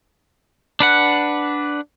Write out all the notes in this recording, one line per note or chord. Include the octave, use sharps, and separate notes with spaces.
D4 B4 F#5